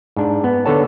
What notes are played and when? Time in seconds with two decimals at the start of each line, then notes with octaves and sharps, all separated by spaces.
0.16 G#2 D4
0.44 B3
0.66 D3 B3 A4 C#5 A5